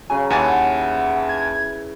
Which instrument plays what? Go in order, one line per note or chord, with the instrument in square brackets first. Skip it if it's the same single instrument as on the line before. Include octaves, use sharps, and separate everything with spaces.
[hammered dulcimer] C#3 F#3 [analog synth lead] G#5
[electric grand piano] D#2 G#5 A6 [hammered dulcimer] E3 [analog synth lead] F#5
[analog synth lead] G#6